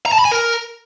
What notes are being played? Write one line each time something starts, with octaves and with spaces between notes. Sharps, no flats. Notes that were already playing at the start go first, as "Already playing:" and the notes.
A#5
A5
B5
G#5
A#4